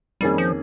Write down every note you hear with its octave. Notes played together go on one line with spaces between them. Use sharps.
F2 D#3 G3 A#3 C#4 G#4
F3